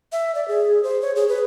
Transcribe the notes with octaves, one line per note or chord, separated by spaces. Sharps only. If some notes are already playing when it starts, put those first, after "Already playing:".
E5
D5
G#4
C5
C#5
G#4
B4